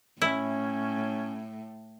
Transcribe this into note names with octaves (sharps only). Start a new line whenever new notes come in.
A2 C#4 E4